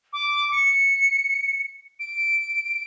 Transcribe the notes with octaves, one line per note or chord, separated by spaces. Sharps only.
D6
C#7
D7